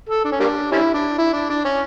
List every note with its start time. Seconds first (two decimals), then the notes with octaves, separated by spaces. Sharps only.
0.09 A4
0.25 D4
0.32 C#4
0.40 G3 A#3 D4
0.72 G3 C#4 E4
0.94 D4
1.18 E4
1.33 D4
1.50 D4
1.65 C#4